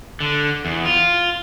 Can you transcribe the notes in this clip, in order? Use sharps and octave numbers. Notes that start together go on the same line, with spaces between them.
D3
E2
F4